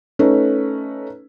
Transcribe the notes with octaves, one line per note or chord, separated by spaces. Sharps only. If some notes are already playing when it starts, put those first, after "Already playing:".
A3 C#4 D#4 B4